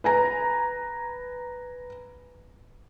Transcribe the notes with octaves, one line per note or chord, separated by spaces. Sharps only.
B4 G#5 A#5